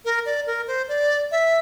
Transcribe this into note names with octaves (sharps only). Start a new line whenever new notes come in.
A#4
D5
A#4
C5
D5
E5